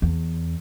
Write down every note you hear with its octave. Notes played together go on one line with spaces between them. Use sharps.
E2